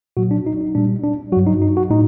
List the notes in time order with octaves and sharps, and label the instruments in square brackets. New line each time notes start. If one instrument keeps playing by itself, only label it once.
[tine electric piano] A#2 F#3 F#4
D4
D#4
D#4
A#2 G3 D4
D4
F#3 F#4
G2
D#4
D#4
F#4
A2 D#4